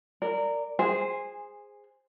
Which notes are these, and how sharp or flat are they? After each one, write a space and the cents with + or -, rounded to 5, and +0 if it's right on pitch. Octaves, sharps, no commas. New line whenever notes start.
A#4 -15 D5 +0
G#4 -10 C5 +0 G#5 -20